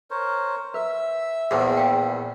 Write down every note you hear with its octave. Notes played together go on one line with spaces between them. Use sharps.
A#4 C5 C#5
B4 E5
A#1 E2 G#4 C5
F5 G5